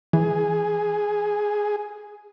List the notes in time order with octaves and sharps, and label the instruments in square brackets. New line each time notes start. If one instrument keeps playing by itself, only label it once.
[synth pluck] E3 [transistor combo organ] G#4